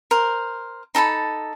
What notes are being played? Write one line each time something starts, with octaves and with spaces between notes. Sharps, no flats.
A#4 C5
D#4 A4 A5 B5